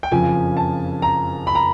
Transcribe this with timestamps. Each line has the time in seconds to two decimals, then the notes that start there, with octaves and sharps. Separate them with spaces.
0.03 G5
0.11 F#1 F2 C#3 F3 G#5
0.57 A5
1.02 A#5
1.47 B5
1.55 A#5